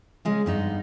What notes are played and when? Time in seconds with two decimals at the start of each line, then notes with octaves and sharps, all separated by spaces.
0.25 C#3 G#3 C#4
0.46 G2 B3 D#4